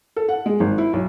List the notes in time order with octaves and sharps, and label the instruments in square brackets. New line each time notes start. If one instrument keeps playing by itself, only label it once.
[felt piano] A4
F#5
G#3
G#1
E4
B1